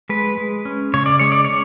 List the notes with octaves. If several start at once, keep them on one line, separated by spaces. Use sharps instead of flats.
G#3 B4
G#3
C#4
C#3 C#5
D5
G#3 C#5
D5
C#4 C#5